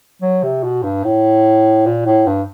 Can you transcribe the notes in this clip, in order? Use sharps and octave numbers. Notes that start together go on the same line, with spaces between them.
F#3
C3
B2
G2
A2
A#2
A2
G2